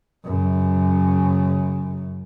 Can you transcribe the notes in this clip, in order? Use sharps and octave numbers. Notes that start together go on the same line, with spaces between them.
F#2 C#3